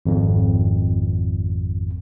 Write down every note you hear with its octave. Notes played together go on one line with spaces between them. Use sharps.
G#1 F2